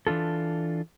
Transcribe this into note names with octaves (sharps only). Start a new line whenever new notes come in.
E3 D4 F4 A4